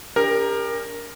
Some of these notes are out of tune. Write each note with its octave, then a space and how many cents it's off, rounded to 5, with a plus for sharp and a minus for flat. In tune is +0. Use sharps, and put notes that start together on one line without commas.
D4 -20 G4 +35 A#4 +5